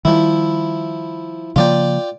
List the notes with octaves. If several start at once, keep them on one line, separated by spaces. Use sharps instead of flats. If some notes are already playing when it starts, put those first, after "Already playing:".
D#3 F3 G3 E4
C#3 F3 A#3 F4 D5 G5